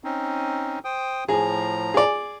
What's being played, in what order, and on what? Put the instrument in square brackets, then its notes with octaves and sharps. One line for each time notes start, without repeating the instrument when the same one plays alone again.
[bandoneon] C4 C#4 D#4
C5 G5 D#6
[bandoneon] A2 F3 A#5 [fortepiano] G#4
[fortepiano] G#4 D5